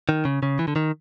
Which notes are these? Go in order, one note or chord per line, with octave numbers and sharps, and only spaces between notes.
D#3
C#3
C#3
E3
D3
D#3